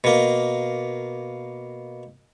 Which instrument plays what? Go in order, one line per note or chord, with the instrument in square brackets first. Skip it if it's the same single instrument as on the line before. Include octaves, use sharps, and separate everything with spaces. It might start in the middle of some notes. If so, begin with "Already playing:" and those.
[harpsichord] B2 A#3